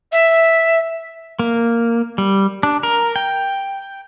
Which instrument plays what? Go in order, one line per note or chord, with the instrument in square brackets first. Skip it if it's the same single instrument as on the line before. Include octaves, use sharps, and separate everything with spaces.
[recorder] E5
[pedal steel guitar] A#3
G3
D4
A#4
G5